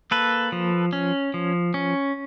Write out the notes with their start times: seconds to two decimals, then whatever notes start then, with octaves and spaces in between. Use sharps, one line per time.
0.11 A#3 A4 B4
0.52 F3
0.93 C#4
1.34 F3
1.74 C#4